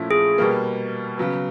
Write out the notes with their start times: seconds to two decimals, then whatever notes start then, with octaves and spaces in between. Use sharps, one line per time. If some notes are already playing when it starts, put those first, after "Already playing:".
Already playing: A#2 F3 A3 C#4 E4
0.11 G#4
0.38 B2 G3 A#3
1.18 C#3 F#3 B3